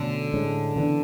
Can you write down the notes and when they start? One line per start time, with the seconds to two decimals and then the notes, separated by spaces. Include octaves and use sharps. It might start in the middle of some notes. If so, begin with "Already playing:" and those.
Already playing: B2 D3 A3 C#4
0.33 A2 G#3 C#4
0.76 C#3 E3 B3 D4